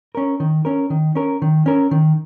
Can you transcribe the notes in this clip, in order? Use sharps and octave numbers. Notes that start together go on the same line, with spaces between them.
C#4 A#4
D#3
C#4 A#4
D#3
C#4 A#4
D#3
C#4 A#4
D#3